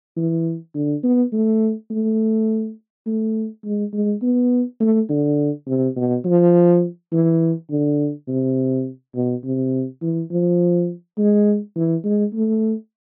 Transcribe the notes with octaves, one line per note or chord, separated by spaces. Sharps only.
E3
D3
B3
A3
A3
A3
G#3
G#3
B3
A3
D3
C3
B2
F3
E3
D3
C3
B2
C3
E3
F3
G#3
E3
G#3
A3